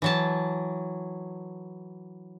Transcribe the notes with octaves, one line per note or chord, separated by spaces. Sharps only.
E3 F#3 A5